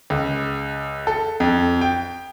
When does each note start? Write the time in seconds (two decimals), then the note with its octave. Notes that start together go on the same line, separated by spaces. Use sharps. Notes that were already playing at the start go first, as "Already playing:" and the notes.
0.10 C#2
1.07 A4
1.40 F2
1.81 G5